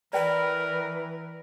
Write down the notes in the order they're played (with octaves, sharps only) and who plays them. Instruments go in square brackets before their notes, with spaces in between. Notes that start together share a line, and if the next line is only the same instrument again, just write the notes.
[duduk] E3 [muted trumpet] A#4 [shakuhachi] B4 [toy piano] D5 G5